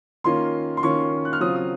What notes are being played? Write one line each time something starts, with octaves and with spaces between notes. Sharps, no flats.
D#3 A#3 C#4 F4 C6
C6
D#3 A#3 C#4 F4 C#6
F#6
F6
C#3 F#3 C4 F4 D#6
D#6